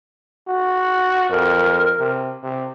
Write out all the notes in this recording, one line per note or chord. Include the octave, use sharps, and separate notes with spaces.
F#4
F2 A#4
C3
C3